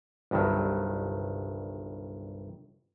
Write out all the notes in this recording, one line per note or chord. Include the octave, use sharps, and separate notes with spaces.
G1 C2 G2 D#3 F#3